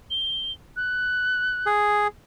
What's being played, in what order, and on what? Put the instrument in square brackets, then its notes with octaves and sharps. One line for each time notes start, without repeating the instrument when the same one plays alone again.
[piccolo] G7
F#6
[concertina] G#4